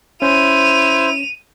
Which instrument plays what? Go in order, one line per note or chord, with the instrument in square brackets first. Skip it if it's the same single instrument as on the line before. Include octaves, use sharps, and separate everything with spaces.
[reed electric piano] C#4 [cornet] E4 [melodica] C5 [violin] D#7 F7